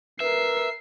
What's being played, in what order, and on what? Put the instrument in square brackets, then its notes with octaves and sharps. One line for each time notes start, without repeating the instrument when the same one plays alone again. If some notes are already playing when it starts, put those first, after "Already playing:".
[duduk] A#4 [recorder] B4 [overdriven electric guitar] E5 [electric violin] C7